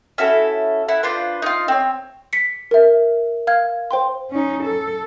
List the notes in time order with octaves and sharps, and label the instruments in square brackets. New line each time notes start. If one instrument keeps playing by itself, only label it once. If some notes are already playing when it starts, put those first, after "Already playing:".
[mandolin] C#4 E4 F#4 A4
E4 F#5
D4 F4 B4 C5
D#4 F4
C4 C#5
[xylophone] B6 C#7
A#4 E5
F5 F6 G#6
C5 G5 C6
[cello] C#4 D#4
A4